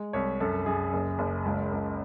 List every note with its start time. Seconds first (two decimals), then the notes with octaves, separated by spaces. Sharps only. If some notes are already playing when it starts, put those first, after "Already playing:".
Already playing: G#3
0.13 C2 C#5
0.40 F#2 A4
0.66 F#2 G#4
0.93 F#1
1.19 F#1
1.45 C#2
1.72 C#2